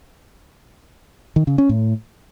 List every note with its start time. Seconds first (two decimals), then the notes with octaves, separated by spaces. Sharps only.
1.36 D#3
1.47 C#3
1.58 C#4
1.69 A2